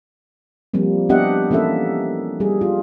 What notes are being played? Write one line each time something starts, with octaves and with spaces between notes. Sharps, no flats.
F3 G3 A#3 C4
B3 D4 G4 D#5 E5 F#5
E3 A#3 C#4 E4 A4 E5
G3 G#4
F4